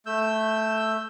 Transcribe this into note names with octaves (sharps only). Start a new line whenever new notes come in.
A3 E6 G6